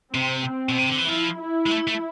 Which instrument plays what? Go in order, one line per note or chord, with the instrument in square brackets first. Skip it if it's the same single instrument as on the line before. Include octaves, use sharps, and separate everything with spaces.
[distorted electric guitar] C3 [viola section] C4
[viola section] C4
[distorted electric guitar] B2
C3
D3
E3
[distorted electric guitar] F3 [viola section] E4
[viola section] E4
[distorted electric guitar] G#3
A3
A3